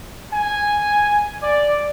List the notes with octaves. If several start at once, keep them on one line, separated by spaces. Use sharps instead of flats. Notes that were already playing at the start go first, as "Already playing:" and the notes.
G#5
D5